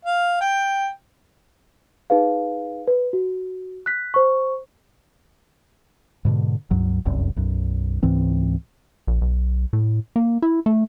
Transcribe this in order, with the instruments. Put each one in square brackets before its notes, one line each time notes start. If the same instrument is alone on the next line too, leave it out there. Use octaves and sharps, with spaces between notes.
[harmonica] F5
G5
[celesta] D#4 G#4 B4 F5
B4
F#4
F#6 B6
C5 C#6
[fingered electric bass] G#2 B2 D3
C#2 G2 F#3
F1 C2 F#2
B1 F#2
C#2 G#2 E3 C4
[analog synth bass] A#1
B1
A2
A#3
E4
A3